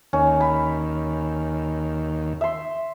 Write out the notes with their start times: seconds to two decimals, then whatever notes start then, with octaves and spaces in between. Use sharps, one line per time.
0.13 D#2 C#4
0.41 B5
2.41 E5 C6